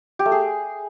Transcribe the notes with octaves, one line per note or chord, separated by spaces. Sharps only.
G4
A3
G#4